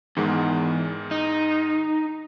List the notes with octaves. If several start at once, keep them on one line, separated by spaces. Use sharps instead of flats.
E2 G#2 D#3 G#3
D#4